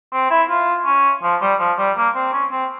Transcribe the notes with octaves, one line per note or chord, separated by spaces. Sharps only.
C4
E4
F4
C#4
F3
G3
F3
G3
A#3
C4
C#4
C4